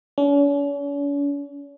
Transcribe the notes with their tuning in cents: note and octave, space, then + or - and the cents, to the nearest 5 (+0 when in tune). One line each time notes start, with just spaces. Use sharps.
C#4 +45